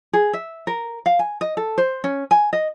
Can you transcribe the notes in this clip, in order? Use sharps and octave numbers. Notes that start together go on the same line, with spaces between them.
G#4
E5
A#4
F5
G#5
D#5
A4
C5
C#4
G#5
D#5